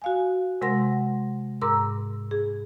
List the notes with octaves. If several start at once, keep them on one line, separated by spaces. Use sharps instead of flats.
F#4 F5 G#5
C3 G#3 A#4 F#5 C6 A#6
G#2 A#4 A#5 D6 E6
G#4